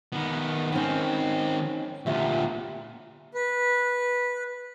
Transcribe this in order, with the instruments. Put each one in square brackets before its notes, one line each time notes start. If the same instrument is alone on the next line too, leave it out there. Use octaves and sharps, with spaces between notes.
[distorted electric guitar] D#3 B3
[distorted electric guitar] D#3 C4 [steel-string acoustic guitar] C#4 D#4
[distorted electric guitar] D2 A#2 [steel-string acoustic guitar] F4 G4 E5
[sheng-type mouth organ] B4